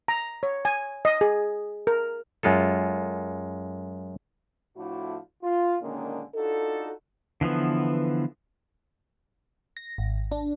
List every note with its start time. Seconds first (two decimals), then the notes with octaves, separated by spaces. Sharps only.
0.08 A#5
0.43 C#5
0.65 G#5
1.05 D#5
1.21 G#4
1.87 A#4
2.43 F#2 G#3 F4 A4
4.77 A2 F3 A3 D4 E4 F#4
5.43 F4
5.82 A#2 D3 D#3 G#3 A#3 C#4
6.35 D4 D#4 F4 F#4 A4
7.41 D3 E3 F3 B3
9.77 A#6
9.98 G#1
10.32 D4